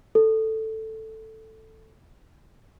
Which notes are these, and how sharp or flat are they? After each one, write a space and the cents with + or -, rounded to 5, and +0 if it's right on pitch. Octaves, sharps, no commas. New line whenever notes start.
A4 +5